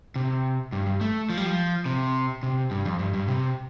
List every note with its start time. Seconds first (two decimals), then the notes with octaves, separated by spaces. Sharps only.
0.16 C3
0.72 G2
0.87 G2
1.01 A3
1.30 F3
1.37 G3
1.46 F3
1.86 C3
2.43 C3
2.71 G2
2.85 F2
2.99 G2
3.14 G2
3.28 C3